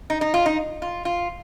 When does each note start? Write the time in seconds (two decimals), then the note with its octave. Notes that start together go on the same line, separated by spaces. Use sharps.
0.10 D#4
0.21 D#4
0.34 F4
0.46 D#4
0.82 F4
1.05 F4